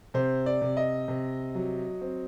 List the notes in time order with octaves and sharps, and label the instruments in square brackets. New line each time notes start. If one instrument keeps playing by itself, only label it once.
[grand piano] C3 C5
D5
C3
D#5
C3
F#3
C4